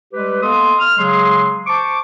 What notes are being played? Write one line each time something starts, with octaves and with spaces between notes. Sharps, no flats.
G3 G#3 G4 B4
A#3 B3 A4 D#5 C6 D#6
F6
C#3 F#3 G#3 G#4 C6
C5 A5 C#6 D6